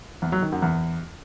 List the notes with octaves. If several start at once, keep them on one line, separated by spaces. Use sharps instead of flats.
E2
F#3
D#3
F#2
E2